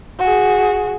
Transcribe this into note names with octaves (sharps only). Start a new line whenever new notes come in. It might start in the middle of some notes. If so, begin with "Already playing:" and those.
F#4 G#4